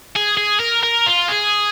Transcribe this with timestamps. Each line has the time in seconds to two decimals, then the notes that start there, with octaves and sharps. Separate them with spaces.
0.16 G#4
0.37 G#4
0.60 A#4
0.83 A#4
1.06 F4
1.28 G#4